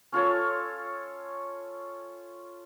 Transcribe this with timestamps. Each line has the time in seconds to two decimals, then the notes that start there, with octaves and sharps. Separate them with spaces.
0.12 C#4 F4 A4 C#5